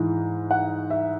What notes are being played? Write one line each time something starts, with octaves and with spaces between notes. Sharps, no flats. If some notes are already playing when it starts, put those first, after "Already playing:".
Already playing: G#2 E3
F#5
E5